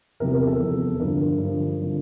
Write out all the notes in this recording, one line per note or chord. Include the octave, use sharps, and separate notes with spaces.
E2 C3 F3 A#4
A#4
A4
E2 C3 F3
G2 D3 F3 A#4
G2 D3 F3
D3 F3